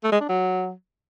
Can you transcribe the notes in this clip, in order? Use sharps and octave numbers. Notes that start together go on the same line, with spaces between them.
A3
G#3
D4
F#3